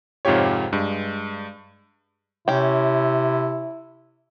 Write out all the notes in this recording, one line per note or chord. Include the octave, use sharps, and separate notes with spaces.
F2 G#2 C3 F4 G4 C#5
G2 G#3
C3 C#4 E4 G5